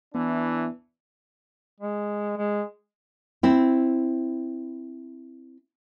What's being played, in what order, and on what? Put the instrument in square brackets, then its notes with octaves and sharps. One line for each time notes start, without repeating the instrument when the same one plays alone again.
[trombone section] E3 D4 E4 [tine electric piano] B3
[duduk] G#3
G#3
[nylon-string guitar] C4 E4